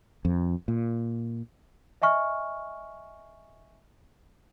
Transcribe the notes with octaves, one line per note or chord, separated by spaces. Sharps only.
F2
A#2
D#5 E5 G#5 C#6 F6